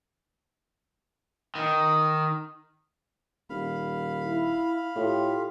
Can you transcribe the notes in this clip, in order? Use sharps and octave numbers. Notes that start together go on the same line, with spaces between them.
D#3
D#1 F5 B5
E4
A2 F4 G4